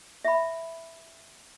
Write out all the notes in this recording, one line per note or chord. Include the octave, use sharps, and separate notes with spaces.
E5 B5